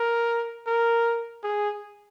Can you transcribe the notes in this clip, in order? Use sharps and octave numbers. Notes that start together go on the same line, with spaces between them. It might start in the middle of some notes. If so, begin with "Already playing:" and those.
Already playing: A#4
A#4
G#4